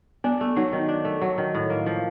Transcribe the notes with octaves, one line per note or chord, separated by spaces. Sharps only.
B3 D4
A3
F#3 D#4
D#3
D4
A3
F#3
D#3
A2
A#3
F3